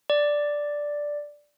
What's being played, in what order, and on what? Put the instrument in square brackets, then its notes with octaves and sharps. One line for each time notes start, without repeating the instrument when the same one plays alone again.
[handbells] D5